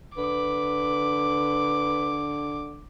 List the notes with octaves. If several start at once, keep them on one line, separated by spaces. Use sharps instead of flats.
D3 B4 D6